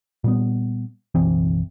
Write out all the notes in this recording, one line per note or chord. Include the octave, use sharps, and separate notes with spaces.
A#2 G3 B3
F#1 B1 E3 C4